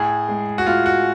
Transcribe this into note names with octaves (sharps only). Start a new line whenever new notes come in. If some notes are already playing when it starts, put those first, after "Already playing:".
Already playing: A2 G#4
G#3
F#4
A2 F4
F#4